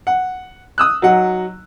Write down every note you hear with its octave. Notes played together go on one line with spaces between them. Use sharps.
F#5
D#6 E6 F#6
F#3 D#4 F#5